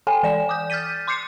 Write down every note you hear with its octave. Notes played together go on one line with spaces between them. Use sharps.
A4 G5 G#5
E3 D5 E7
D6 D#6 G6
F6 G6 A6 B6 D#7
C6 D6 G6 C7 C#7